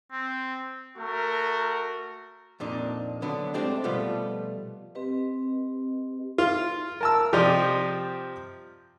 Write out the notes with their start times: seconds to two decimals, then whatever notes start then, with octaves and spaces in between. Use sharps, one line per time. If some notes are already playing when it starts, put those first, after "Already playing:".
0.12 C4
0.97 A3 F#4 A#4
2.60 F2 A#2 D4 D#4
3.22 D3 F#3 B3 D4
3.54 G#3 A3 C4 D4 G4
3.84 B2 F3 G3 A3 B3 F4
4.95 C4 G4 B4 D#5
6.38 F4
7.01 A#4 A5 E6
7.33 C3 F3 G4 C5 D5 D#5